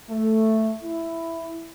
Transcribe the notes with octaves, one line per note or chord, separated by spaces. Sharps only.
A3
E4